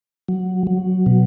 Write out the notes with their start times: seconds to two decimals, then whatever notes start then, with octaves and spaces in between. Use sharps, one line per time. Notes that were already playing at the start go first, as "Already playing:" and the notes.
0.28 F#3
0.67 F#3
1.06 B2